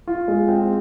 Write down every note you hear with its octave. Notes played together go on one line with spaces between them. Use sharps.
F4
G#3
C4